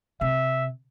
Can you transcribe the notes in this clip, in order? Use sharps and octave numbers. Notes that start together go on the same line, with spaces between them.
C3 E5